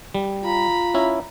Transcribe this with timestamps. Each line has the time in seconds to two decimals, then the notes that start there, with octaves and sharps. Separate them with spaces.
0.15 G3
0.44 F4 A#5 B5
0.94 C#4 E4